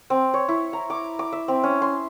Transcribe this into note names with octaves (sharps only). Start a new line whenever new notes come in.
C4
C#5
E4
A#5
D6
D6
E5
C4
C#4
C6